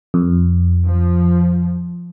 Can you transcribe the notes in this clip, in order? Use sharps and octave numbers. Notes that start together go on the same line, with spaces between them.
F2
F3